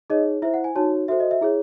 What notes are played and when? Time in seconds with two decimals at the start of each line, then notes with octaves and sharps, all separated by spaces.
0.10 D#4 G#4 C#5 D#5
0.42 E4 C5 E5
0.54 F#5
0.64 G#5
0.75 D#4 F#4 C#5 A5
1.08 F#4 A4 C5 E5
1.20 D#5
1.31 E5
1.41 E4 G#4 C#5